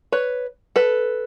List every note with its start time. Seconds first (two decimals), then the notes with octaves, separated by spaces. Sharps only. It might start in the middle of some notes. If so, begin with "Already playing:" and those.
0.12 B4 C#5
0.76 A4 B4